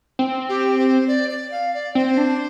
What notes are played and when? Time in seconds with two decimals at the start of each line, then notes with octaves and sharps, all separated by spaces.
0.19 C4
0.49 G4
0.78 C5
1.08 D5
1.30 D5
1.51 F5
1.74 D5
1.95 C4 C5
2.17 D4